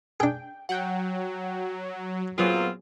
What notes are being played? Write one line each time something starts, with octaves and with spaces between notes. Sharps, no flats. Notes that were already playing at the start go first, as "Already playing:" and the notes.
D4 G#4 G5
F#3 F#5 G5
A#2 F#3 B3 C4 F4 G#4